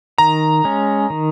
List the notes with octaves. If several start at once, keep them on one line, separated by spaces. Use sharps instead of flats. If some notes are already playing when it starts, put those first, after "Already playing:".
D#3 A#5
G#3 C#4
D#3